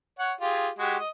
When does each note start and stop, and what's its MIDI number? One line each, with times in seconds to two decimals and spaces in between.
0.19 0.32 73
0.19 0.32 78
0.41 0.69 65
0.41 0.69 67
0.41 0.69 68
0.79 0.97 56
0.79 0.97 66
0.79 0.97 67
0.99 1.09 75